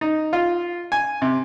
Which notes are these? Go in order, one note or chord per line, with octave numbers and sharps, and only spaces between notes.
D#4
F4
G#5
C3